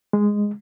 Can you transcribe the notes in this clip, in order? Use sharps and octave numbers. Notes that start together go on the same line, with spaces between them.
G#3